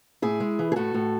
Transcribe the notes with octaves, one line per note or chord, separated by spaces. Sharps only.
A2 E4 G#4
G#3
E3
G#4
A2 F#4 A4
A2